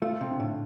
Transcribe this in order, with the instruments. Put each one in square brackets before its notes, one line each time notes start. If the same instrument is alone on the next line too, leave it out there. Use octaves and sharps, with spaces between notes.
[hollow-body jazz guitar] A3 [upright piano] F4
[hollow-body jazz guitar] C3
[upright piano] D3
[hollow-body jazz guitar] A2